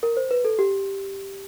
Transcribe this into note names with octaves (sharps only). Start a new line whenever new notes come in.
A#4
C5
B4
A4
G4